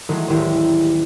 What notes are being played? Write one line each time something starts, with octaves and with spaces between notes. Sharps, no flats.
D#3 E3 F#3 G#3 A3 D#4
D#1 A1 D#3 G#3 E4 G4